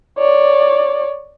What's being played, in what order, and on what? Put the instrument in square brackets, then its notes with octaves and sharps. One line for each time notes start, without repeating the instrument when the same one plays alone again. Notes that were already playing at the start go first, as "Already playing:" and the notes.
[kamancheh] C#5 D5